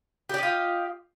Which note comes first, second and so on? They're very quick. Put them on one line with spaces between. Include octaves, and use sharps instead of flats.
G4 D5 D#5 F4